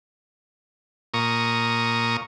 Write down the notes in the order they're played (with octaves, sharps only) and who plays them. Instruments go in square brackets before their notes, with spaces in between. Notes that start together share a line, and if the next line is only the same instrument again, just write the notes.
[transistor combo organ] A#2 A#5 C#6 D#6